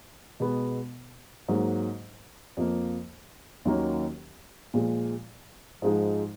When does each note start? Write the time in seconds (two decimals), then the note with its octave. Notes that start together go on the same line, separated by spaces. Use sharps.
0.40 B2 G#3 B3
1.48 G#2 F#3 A#3 D#4
2.57 F2 F3 A#3
3.65 D#2 D#3 F#3 A#3 C#4
4.74 A#2 F3 G#3
5.82 G#2 F3 G#3 D#4